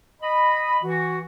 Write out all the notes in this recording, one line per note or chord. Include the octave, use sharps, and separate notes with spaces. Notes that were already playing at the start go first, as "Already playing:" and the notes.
D#5 B5
E3 F#4